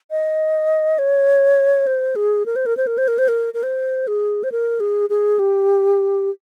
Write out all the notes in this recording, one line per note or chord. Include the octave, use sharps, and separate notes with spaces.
D#5
C#5
C5
G#4
A#4
C5
A#4
C5
A#4
C5
A#4
C5
A#4
A#4
C5
G#4
C5
A#4
G#4
G#4
G4